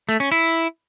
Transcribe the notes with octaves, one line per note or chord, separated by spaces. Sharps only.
A3
C#4
E4